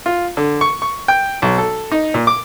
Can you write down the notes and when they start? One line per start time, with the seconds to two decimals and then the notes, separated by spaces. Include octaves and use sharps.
0.06 F4
0.37 D3
0.61 C#6
0.82 C#6
1.08 G5
1.42 B1
1.58 A4
1.92 D#4
2.14 A#2
2.27 D6